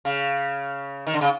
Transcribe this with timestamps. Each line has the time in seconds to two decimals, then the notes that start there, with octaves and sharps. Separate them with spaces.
0.05 C#3
1.07 D#3
1.14 D3
1.21 C#3